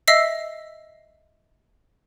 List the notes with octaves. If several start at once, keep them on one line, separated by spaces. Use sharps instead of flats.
D#5 E5 E6 B6 C7